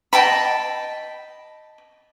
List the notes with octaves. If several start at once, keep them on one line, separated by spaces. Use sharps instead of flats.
D#5 G5 A5 B5